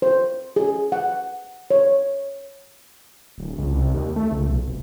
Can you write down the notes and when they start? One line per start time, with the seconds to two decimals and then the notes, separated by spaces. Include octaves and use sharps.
0.02 C5
0.56 G#4
0.92 F#5
1.71 C#5
3.38 D1
3.58 C#2
3.73 C2
3.94 D#2
4.16 A3
4.31 C#2
4.49 B1
4.67 F1